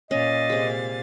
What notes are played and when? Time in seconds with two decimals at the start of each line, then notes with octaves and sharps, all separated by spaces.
0.11 A#2 C#4 D#5 F5 A6
0.50 C3 G#3